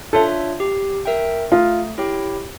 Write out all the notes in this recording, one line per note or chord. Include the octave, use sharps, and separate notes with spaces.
D4 F4 A4 C#5 E5
G4
A#4 E5 G5
A3 F4
E4 G4 C#5 G5